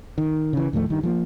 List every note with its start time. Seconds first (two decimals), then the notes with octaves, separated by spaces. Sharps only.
0.18 D#3
0.53 C#3 E3
0.73 D#2 A2 F3 A3
0.90 G2 D#3
1.03 F3 G#3 A#3